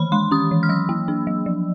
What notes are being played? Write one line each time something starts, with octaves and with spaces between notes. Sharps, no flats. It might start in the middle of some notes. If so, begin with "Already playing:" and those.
Already playing: D#3 E3 B5
G#3 C6
C#4 D#6
E3
F6
F#3 E6
A#3
D4
F#3
F3